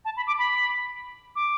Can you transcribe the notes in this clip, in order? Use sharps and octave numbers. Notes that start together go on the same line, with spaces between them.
A5
B5
D6
B5
D6